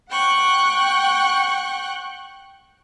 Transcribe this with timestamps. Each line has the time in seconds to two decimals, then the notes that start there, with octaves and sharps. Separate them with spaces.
0.11 F#5 G5 C#6 F#6